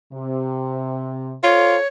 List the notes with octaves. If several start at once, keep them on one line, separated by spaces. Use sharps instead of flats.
C3
F4 A4 C5 C#5